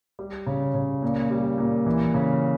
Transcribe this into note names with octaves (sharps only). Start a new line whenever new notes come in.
G3
C#3
C#3
A#2
G3
A#2
E3
C#3